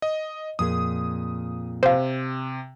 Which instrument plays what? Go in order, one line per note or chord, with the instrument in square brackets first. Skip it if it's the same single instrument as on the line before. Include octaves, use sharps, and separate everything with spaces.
[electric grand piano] D#5
[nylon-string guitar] F2 A#2 G#4 [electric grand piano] D#6
[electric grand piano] C3 [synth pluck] C5 F5